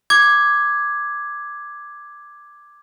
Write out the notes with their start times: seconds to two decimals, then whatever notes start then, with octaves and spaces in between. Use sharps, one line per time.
0.10 D6 G#6